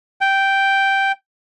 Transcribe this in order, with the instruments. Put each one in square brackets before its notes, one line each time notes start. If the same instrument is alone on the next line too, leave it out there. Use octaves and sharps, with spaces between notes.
[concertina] G5